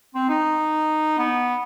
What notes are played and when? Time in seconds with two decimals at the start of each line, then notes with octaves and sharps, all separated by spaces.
0.15 C4
0.29 D#4
1.18 B3